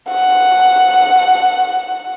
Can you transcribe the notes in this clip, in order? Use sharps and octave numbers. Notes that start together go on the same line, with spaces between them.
F#5